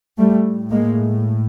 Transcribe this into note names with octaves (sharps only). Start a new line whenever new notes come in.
A2 G3 A3
G#3 A#3